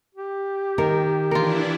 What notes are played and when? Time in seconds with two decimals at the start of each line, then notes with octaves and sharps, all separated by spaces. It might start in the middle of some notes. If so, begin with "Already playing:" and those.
0.15 G4
0.78 D#3 A#4
1.31 E3 D4 E4 F4 A#4